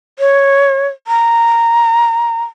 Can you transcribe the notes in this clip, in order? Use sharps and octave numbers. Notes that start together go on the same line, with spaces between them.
C#5
A#5